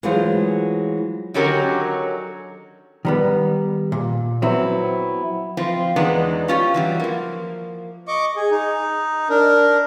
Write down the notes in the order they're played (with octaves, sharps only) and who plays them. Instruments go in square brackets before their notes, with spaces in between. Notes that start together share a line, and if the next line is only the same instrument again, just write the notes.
[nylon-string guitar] E3 F#3 G#3 A3 F4 C5
[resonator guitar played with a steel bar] D3 D#3 F#3 C#4 G4 A#4
[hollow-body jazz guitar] D#3 G3 B3
A#2
F#3 B3 C4 E4
[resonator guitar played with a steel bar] F3 C4 F4
E2 E3 G#3 B3 D4 D#4
C#4 F4 G4
E3 F#3 G3
F3 A#3
[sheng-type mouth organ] D#5 C#6 D6
G#4
D#4
D4 A#4